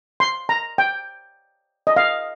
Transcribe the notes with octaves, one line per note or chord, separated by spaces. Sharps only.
C6
A#5
G5
D#5
F5